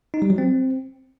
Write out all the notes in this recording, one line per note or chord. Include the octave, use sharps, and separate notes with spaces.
D#4
G3
F#3
C4